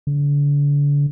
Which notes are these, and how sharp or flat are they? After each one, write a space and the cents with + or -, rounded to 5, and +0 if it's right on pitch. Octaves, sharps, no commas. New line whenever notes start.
D3 -35